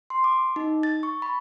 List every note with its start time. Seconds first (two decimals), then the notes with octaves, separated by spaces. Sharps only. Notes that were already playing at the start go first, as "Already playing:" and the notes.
0.10 C6
0.24 D6
0.56 D#4
0.83 A6
1.03 C#6
1.22 B5